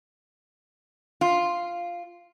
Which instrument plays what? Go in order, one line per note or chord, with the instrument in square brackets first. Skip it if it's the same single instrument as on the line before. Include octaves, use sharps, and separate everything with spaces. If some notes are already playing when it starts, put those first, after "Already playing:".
[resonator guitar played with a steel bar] F4